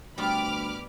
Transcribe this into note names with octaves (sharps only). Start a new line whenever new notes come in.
D2 G3 B3 F4 B5 D6 F6